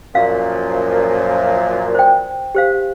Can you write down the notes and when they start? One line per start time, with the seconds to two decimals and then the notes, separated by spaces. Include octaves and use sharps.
0.15 F#2 A#2 F3 F5
1.95 C5 G5
2.55 G4 C5 F5